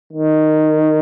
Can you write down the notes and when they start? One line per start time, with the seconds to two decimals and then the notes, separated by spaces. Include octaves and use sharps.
0.13 D#3